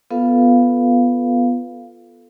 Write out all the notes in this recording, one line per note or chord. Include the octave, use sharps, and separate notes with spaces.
B3 F4 A4 B4 F5